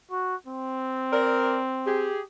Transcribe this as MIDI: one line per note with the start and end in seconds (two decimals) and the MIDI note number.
0.11 0.35 66
0.47 2.12 60
1.12 1.59 70
1.12 1.59 74
1.87 2.20 67
1.87 2.20 68